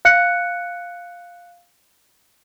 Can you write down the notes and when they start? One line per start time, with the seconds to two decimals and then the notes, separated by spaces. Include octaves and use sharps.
0.05 F5 F#6 C#7